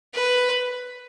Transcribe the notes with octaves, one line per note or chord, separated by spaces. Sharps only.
B4